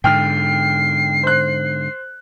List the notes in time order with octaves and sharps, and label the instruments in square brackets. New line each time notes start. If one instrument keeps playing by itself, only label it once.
[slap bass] G#2 D3 [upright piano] G5 F6 [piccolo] C7
[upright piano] C5 F#6